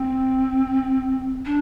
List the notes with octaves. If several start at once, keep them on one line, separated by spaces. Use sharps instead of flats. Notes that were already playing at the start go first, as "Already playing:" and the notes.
Already playing: C4
D4